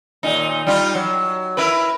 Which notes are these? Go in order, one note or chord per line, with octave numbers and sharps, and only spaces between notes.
D#2 A#2 D#4
G3 D#4 F4
F#3
E4 A#4 B4